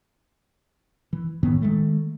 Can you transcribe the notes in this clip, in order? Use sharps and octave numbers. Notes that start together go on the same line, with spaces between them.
E3
A2 D#3 E3 B3
D#3 G#3 A3